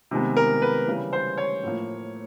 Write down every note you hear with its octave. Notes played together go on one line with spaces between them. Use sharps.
C3 D#3 G#3 B3
A#4
B4
C#3 E3 G3
C5
C#5
A2 F3 A#3